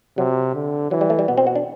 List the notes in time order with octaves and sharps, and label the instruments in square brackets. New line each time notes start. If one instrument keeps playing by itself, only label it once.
[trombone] C3 [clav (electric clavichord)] F#3
[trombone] D3
[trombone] E3 [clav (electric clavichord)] F#3
[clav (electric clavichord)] G3
A3
G3
[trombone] B2 [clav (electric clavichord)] B3
[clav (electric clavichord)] C4
F#4
D4